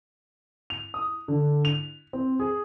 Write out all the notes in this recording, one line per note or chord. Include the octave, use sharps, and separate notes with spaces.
F7
D#6
D3
F7
C4
G#4